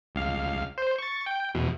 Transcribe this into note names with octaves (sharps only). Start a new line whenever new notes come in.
C#2 F5
C5
C#6 A6
G5
E2 B2